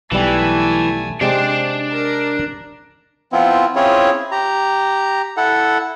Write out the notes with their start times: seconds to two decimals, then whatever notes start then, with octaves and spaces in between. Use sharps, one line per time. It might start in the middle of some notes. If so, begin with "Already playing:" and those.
0.12 B1 E3 G3 A3 G#5
1.21 C3 G#3 C4 D4 C5 D5
1.92 A#4 A#5
3.32 F3 B3 C4 E4 F4
3.76 C4 C#4 E4 F4 G#4 C#5
4.32 G4 A#5
5.37 E4 A4 F#5